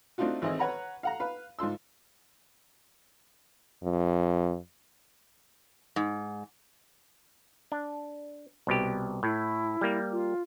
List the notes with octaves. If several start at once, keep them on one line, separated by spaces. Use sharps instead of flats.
A3 C4 D4 D#4 F4 F#4
G#1 E3 C4 E4 G#4 D#5
B4 C#5 F#5 A#5 B5
F5 F#5 A#5
B4 F5 B5
G#2 F4 C6 E6
F2
G#2
D4
C2 B2 G4
A2 E4
G3 A#3
F4